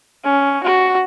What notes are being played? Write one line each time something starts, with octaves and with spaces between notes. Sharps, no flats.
C#4
F#4